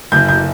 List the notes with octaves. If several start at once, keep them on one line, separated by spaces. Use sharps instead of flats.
F#1 G6
G6